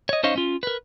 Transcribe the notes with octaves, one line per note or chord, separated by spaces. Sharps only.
C#5 D#5
C#4 D#4 C5 C#5 D#5 F5
C#4 F4
A#4 B4